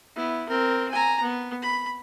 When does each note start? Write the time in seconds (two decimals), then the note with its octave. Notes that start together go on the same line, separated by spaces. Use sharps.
0.15 B3 E4
0.48 C4 A#4
0.91 G#5 A#5
1.22 B3
1.62 B5